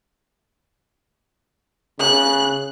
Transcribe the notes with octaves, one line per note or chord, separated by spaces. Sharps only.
C#3 F#6